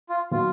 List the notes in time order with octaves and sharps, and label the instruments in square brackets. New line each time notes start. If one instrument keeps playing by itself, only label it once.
[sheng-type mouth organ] F4
[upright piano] D#3 F#3 B3 [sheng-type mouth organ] F4